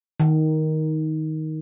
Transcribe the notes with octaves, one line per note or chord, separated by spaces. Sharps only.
D#3